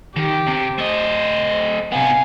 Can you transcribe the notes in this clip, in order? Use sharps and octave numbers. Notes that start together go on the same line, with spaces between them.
D#3 G4
C3
A3 C5 D#5
C3 B3 F5 G#5